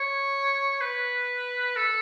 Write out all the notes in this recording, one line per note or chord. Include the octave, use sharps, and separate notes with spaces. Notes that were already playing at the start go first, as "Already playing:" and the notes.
Already playing: C#5
B4
A4